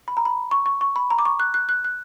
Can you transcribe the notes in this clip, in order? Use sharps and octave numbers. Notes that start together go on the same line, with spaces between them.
B5
A#5
B5
C#6
C#6
C#6
B5
A#5
D6
C#6
F#6
F#6
F#6
F#6